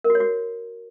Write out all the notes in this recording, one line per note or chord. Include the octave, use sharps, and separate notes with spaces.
A#4
F#4
C#5
F#4